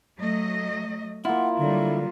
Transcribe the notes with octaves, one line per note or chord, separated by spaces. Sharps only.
F#3 A3 D#5
A#3 E4 F4 F#5
D3 F#3 G3